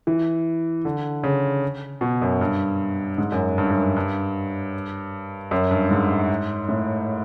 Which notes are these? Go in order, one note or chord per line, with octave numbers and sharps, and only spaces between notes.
E3
D3
C#3
B2
F#2
G2
G#2
F#2
G2
F#2
G2
G2
F#2
G2
G#2
A2